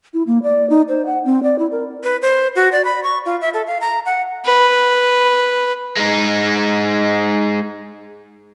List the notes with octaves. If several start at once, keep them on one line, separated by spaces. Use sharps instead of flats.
E4
A#3
D5
D#4
C5
F#5
C4
D5
E4
A#4
B4
C5
F#4
D5
B5
C#6
F4
E5
A4
F5
A#5
F#5
B4
G#3 D#4